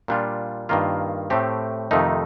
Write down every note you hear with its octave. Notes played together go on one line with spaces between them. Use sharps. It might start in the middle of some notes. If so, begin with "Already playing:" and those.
A#2 G3 D4 F4
G2 D#3 A#3 F4
A2 A3 C4 G4
F2 C3 D#3 A3 D#4